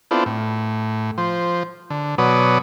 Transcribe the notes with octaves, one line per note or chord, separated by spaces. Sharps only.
B3 C4 D4 E4 F4 A4
A2
F3 C5
D3
B2 F#3 B4 C#5 D5 D#6